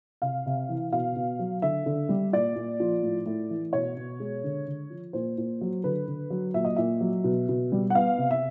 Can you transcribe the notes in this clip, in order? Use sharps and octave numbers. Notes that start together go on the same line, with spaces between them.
C3 F5
C3
E3
B2 F5
B2
F#3
D3 E5
D3
G3
A#2 D5
A#2
F3
A2
A2
E3
B2 C#5
B2
G#3
D3
D3
F3
A#2 C5
A#2
F#3
D3 B4
D3
F#3
A#2 E5
D#5
A#2 E5
F#3
B2
B2
G3
F#5
B3 F5
C3
E5